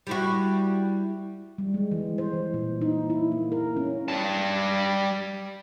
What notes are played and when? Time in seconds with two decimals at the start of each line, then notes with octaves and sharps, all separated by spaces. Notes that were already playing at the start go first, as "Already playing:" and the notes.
0.07 G3 E4 F#4
1.58 G3
1.74 G#3
1.91 E3
2.18 C5
2.33 E3
2.54 A#2
2.81 D#4
3.10 E4
3.32 A#3
3.52 A#4
3.77 C#4
4.08 G3 A5